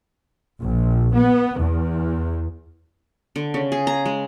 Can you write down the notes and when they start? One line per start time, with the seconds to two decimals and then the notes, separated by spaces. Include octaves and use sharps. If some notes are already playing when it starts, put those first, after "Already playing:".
0.60 A#1
1.15 B3
1.60 E2
3.36 D3
3.54 C#3
3.72 G#4
3.87 A#5
4.06 G#3